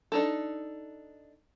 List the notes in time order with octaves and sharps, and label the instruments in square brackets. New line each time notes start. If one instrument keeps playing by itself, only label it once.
[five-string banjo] D4 D#4 A4